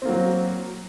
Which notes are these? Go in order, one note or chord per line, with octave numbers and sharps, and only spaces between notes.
F#3 A#3 C4